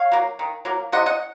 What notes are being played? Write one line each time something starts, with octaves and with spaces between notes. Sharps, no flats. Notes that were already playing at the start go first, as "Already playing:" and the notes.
Already playing: C#5 F5
F#3 A#3
D#3
F#3 A#3
C3 D#5 F#5
D#5 F#5